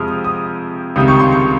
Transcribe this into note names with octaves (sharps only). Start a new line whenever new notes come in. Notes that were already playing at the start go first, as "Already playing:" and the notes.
Already playing: F2 C3 F3 G#3 D#6 F6
D#6
C#2 C3 D#3 G3 D#6
C#6
C6
C#6